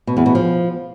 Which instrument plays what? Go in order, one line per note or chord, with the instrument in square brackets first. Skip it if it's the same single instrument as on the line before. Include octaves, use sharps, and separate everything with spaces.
[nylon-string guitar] B2
E2
B2
F3